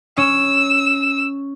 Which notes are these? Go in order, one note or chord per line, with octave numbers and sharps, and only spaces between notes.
C#4 E6